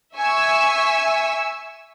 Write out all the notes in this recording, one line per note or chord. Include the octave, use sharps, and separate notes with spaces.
E5 G#5 C#6 E6